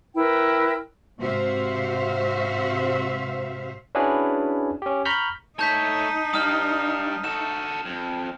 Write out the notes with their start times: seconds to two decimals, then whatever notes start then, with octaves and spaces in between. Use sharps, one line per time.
0.15 E4 A#4 B4 G5
1.18 G#2 C3 F#4 C5 E5 F5
3.95 C#4 D4 E4 F#4 G#4 B4
4.82 C#4 G4
5.05 A#5 B5 C#6 F6 G6 B6
5.59 A3 D#4 C#5 A5 G6 B6
6.34 G2 G3 D#6 F6
7.24 F#4 A4 E7
7.85 F2